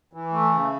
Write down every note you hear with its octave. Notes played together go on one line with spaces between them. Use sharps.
E3
A3
C#3